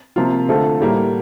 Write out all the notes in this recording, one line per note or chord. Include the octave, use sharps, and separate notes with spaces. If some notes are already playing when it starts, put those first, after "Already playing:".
C3 F3 A#3 F4
D3 A3 C4 F4 A4
A2 G3 A#3